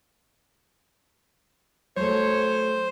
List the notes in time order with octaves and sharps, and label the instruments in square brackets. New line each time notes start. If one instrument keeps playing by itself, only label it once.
[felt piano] F#3 A3 [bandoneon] C5 [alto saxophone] C#5